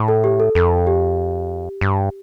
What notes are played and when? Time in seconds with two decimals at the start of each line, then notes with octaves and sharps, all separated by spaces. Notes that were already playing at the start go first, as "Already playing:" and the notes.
Already playing: A2
0.08 A4
0.24 G4
0.40 A4
0.55 F2 A4
0.87 G4
1.81 G2